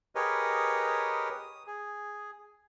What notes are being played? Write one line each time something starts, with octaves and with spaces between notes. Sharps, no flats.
G4 G#4 A#4 B4 C#5 D#5
D#6
G#4